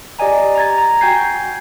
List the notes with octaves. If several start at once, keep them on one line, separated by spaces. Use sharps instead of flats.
G4 D5 D#5 G#5 A#5
A#5 G#6 A6
A#5
F#4 G5 G#5 G6 G#6 C7